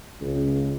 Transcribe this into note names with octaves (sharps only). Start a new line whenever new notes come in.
C#2